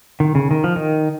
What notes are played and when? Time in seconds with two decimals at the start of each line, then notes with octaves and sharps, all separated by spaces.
0.20 D#3
0.35 C#3
0.51 D#3
0.64 F3
0.76 D#3